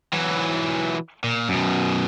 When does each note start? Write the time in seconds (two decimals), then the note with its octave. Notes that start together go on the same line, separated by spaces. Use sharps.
0.13 E3 F#3
1.24 A#2
1.49 F#2 B2